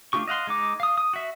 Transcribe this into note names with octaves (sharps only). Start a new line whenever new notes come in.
A3 D4 F4 G4 C#6
D#5 F5 F#5 C6
G#3 D#4 D6
F5 D#6
D#6
F#4 E5